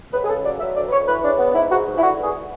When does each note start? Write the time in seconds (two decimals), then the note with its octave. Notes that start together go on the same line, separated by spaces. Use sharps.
0.13 C#2 B4
0.23 G#4
0.29 C#3 A4
0.44 F#3 D5
0.60 F#3 E5
0.76 D2 D5
0.88 B4
0.92 D2 C#5
1.08 E3 B4
1.24 C#3 D4
1.39 B3
1.55 G#2 E4
1.71 G#2 F#4
1.87 G#2
1.98 E4
2.02 D3 F#4
2.18 E2
2.23 G#4